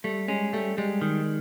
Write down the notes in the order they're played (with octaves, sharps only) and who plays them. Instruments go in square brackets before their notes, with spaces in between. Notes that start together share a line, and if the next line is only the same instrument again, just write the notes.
[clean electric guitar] G3 [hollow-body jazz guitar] A3
[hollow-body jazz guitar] G#3 [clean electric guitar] C#4
[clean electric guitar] G3 [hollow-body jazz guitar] A3
[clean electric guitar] G3 [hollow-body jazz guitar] G#3
[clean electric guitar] D#3